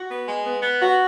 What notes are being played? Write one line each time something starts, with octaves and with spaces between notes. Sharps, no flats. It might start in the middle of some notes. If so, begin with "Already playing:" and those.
Already playing: F#4
B3
G#3
B3
B3
F#4